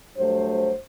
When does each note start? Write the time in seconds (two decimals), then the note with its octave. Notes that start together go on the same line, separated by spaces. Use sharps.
0.17 G2 F#3 A3 C5